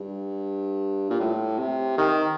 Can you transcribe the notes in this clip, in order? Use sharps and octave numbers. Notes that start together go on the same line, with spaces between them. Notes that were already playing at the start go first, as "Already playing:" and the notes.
Already playing: G2
A#2
A2
C3
D#3